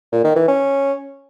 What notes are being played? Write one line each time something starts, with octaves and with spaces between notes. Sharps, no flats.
A#2
D#3
E3
C#4